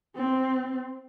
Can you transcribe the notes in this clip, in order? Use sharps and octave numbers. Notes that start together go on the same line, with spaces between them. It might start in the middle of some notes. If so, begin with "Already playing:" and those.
C4